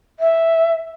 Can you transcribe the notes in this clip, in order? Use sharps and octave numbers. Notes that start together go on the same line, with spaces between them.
E5